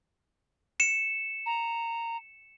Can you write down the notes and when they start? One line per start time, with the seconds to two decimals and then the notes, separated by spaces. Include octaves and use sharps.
0.80 C#7 E7
1.46 A#5